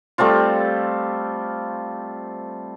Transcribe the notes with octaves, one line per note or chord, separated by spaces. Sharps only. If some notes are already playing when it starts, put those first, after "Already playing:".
G3 A3 C4 F4